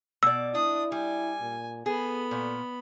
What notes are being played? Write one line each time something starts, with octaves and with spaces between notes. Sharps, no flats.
B2 D5 E6
D4 E4 D#6
G3 G#5
A#2
B3 G#4 A4 B5
A#2